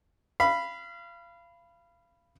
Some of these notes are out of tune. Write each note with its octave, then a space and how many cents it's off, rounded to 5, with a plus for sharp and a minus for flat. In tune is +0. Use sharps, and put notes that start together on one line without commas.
F5 -30 B5 +0